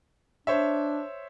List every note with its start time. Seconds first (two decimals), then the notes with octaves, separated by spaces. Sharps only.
0.47 D4 C5 C#5 E5